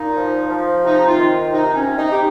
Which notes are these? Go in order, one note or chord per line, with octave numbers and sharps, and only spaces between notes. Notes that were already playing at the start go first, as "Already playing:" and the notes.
Already playing: A#2 D#4
F3
F3
C3 D#4
F4
D#3
C3 D#4
C#4
C3
D#4
G4